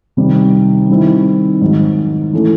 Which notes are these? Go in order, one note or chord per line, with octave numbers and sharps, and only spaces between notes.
C3 D#3 G3
D#3 G3 C4 E4
G#2 D#3 F#3
E3 A3 C#4 E4